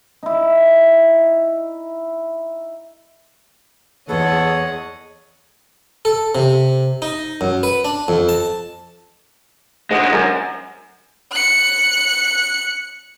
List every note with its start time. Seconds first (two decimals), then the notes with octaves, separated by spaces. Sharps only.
0.23 D#4 E4
4.09 E2 B3 G#4 A4 C#5 D#5 F#5
6.05 A4
6.35 C3
7.02 D#4
7.41 F#2
7.63 B4
7.85 D4
8.08 F2
8.29 A5
9.91 D3 G#3 C5 F#5 D#6
10.12 F#2 A#4 G#5
11.32 F#6 C#7